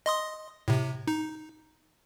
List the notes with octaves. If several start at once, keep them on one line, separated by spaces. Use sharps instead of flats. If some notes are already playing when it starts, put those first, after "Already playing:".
D#5 C6 D#6
A2 C3
D#4